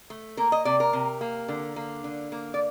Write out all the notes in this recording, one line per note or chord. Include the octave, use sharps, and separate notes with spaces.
A3
A#3 A#4
D#5
C3 D5
A#4
C3
A#3
D3
A#3
D3
A#3
D5